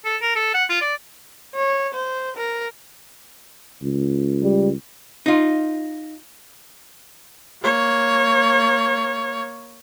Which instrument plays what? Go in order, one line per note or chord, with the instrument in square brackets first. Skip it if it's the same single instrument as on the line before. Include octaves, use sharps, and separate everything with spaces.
[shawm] A4
A#4
A4
F#5
F4
D5
[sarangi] C#5
C5
A#4
[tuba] C#2
[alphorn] G3
[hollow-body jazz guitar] D#4 F4
[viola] A#3 C#5